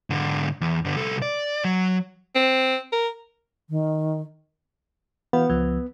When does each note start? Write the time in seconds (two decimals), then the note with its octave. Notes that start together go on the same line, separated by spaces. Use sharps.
0.10 G#2 D3
0.61 E2
0.84 G2 D3
0.96 C2 A4
1.22 D5
1.65 F#3
2.35 C4
2.92 A#4
3.70 D#3
5.33 E3 B3 F#4 F5
5.50 C#2 F3